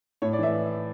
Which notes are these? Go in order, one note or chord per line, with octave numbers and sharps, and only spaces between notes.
A2 C#5
D5
E3 E5